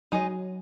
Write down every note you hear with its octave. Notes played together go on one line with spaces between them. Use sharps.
F#3 G#3 D#4 G#4 D#5